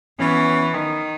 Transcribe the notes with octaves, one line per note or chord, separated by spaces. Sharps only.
E3 B3 C#4
D#3